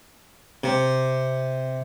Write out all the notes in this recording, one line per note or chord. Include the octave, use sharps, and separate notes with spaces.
C3